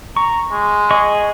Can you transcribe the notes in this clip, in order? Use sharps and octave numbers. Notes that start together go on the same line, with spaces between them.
A#5 C#6
G#3
G#4 D#5 C#6